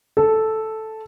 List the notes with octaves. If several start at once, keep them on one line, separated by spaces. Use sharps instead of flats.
A4